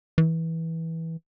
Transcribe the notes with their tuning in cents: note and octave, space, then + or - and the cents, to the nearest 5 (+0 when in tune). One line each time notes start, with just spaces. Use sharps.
E3 -15